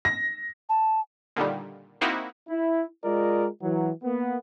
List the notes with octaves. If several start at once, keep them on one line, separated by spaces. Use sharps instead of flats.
A#6
A5
A#2 D3 D#3 G3
A#3 C4 D#4 E4 F#4
E4
G#3 F4 A#4 D5 D#5
E3 F#3
A#3 B3